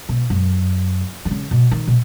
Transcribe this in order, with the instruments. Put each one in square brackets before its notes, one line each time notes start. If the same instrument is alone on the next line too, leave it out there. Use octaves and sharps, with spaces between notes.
[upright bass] B2
F#2
D#3
C#3
B2
D#3
B2